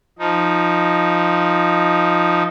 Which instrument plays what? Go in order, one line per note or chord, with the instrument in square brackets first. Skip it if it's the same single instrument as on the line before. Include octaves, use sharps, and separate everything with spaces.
[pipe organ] F3 D#4